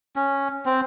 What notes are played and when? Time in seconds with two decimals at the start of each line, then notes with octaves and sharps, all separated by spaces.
0.16 C#4
0.66 C4